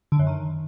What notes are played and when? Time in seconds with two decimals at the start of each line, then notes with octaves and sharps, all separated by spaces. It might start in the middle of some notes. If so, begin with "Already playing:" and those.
0.12 D3
0.19 F#2
0.27 D#3